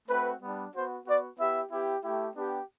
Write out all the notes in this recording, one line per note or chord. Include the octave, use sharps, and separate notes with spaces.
A3 C4 F#4 B4
G3 B3 D4
B3 F#4 C5
B3 F#4 D5
B3 E4 G4 E5
B3 E4 G4
A3 E4 G4
B3 D4 G4